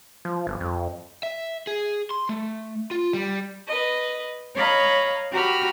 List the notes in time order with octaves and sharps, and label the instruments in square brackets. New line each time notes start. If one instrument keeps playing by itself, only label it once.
[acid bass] F3
G1
F2
[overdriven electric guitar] E5
G#4
C6
A3
F4
G3
[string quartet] B4 D#5
C#5 D#5 F5 A#5 B5
F#4 G4 A#5 B5 F6